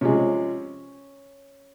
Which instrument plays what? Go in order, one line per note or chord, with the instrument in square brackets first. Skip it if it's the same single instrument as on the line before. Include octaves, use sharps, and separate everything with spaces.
[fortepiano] C3 F3 G#3 C#4